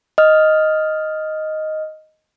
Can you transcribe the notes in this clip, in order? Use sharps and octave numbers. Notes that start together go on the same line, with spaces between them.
D#5 F6